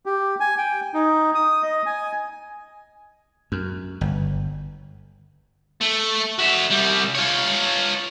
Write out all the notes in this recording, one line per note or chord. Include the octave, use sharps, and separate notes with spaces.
G4
G#5
G5
D#4
D#6
D#5
G#5
F#2
G1
A3
F#4 E5
C2 G3
F4 C#5